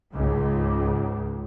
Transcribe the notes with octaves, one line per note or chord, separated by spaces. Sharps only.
C#2 G#2